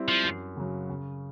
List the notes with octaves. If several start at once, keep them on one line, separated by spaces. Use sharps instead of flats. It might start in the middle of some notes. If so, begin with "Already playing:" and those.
Already playing: G3 C4 E4
F3
F#2
C#3 F#3
C#3